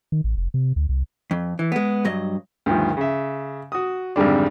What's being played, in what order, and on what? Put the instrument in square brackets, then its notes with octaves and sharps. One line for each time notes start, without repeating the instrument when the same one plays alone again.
[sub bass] D#3
A1
F1
C3
D2
C2
[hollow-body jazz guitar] F2
E3
G#3 B3
G2 F#3 D#5
[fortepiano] D2 G2 D#3 F3
C#3 E5
F#4 D#6
G#1 F2 D3 G3 D4